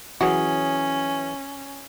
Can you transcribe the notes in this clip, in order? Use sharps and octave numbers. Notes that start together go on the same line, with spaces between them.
E3 F#3 C#4 F#4 G#4